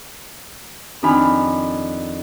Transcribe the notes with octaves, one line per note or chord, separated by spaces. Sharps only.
F2 D#3 D4 G#5 B5 F6